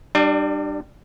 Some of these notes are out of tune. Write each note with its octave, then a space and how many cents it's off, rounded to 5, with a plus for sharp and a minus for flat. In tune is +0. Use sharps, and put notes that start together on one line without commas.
G3 -10 D4 +30